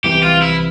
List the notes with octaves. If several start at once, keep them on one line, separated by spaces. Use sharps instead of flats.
C2 C3 E3 G4
F4
E4